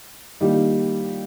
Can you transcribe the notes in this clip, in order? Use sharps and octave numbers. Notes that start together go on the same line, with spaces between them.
D#3 G3 A#3 D#4